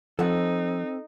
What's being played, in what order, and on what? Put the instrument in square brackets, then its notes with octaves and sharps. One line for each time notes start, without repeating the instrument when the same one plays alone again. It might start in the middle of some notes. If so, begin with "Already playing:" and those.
[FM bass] F3 [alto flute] C4 [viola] D#4 [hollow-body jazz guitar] A4 F#5